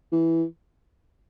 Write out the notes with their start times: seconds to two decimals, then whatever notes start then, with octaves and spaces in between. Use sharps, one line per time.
0.12 E3